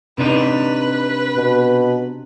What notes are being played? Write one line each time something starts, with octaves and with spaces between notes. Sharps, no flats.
C3 D4 D#4 B4
B2